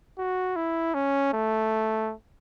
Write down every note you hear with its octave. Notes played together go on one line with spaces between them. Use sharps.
F#4
E4
C#4
A3